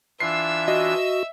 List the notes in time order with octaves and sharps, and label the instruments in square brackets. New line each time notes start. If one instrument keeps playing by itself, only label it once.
[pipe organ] E3 D4 F4 [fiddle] E5 E6 [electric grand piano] C7
[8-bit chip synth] F#4 [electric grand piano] D#5